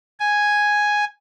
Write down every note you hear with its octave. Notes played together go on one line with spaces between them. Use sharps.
G#5